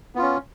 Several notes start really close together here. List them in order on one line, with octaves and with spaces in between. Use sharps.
B3 F4 C#4